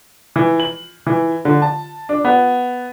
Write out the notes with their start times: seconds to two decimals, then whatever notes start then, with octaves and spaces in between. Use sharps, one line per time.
0.36 E3
0.60 F#7
1.06 E3
1.45 D3
1.62 A5
2.09 D4
2.25 B3